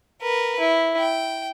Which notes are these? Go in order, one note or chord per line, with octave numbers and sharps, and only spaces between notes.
A#4 B4
E4
G5